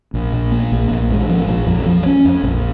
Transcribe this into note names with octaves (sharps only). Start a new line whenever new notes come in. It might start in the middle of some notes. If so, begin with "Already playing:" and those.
A#1
A#2
A#3
A#1
A#1
G#2
F3
A#1
F2
F3
C#4
F2
A#1